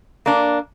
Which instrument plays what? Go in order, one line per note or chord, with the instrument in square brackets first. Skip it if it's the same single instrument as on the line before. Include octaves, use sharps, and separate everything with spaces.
[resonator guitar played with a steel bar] A#3 D4